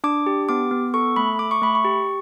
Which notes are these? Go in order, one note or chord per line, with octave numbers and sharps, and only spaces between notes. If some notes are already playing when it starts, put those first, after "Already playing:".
D4 D6
G4
B3 D6
B3
A4 C#6
A3 B5
A3 D6
C#6
A3 B5
C#6
G4